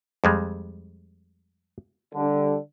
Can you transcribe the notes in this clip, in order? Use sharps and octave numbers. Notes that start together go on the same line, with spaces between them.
F2 G3 G#3
D3 G3